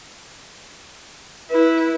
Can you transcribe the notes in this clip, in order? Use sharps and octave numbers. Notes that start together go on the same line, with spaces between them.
E4 B4